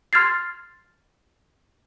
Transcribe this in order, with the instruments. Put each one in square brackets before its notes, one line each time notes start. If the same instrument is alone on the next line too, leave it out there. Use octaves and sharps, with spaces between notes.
[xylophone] C6 F6 G#6 A6 C7